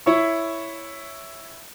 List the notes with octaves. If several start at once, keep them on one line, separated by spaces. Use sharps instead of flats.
E4 C#5 E5 C#6